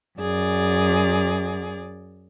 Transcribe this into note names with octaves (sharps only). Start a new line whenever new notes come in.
F#2 G#4 D5